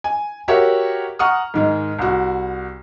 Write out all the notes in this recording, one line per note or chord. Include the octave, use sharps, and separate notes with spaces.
G#5
F#4 G4 A#4 C#5 E5 F#5
F#5 A#5 C#6 D#6 F6
G#2 D#3 G#3
C2 F#4